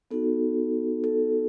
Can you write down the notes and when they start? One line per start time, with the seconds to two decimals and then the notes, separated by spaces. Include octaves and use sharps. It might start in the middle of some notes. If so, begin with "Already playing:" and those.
0.11 B3 D#4 F#4 A4
1.04 A4